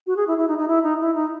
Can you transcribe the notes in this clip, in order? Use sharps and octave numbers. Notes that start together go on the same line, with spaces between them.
F#4
G#4
E4
E4
D#4
D#4
E4
D#4
E4
D#4